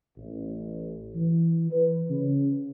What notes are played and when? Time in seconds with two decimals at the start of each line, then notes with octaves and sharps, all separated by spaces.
0.17 A1
1.16 E3
1.71 B4
2.09 C#3